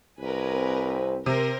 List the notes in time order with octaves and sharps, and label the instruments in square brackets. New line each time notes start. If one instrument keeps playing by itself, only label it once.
[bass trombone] C2 [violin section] A#4 B4 G#5
[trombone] C4
[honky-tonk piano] C3 [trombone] C4 [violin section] A#4 C5